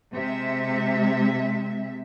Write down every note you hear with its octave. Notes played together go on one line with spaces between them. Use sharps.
C3 G#3 E5